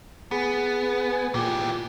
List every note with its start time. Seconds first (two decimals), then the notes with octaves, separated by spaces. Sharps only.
0.31 B3 G#4
1.12 G#5
1.34 A#2 E3 G4